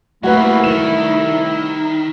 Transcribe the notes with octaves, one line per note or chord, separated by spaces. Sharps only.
C2 F#3 A3 A#3 E4 F#4 B4
D#3 E7